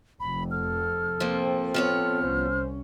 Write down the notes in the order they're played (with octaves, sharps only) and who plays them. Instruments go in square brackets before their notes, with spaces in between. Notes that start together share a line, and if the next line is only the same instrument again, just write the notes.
[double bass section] F1 F2 C3 [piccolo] B5
[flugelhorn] A4 [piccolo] F6
[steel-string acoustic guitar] F3 A#3 [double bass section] C4
[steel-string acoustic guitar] F3 B3 C#5 [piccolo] F6
[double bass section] C2 C#4 [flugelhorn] C5